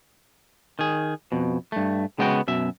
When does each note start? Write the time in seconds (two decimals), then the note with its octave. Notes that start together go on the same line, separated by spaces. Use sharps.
0.79 D#3 G#4
1.32 F2 B2
1.72 G2 A3
2.19 C#3 G#3 B3 F#4 G5
2.48 F#2 B2 E5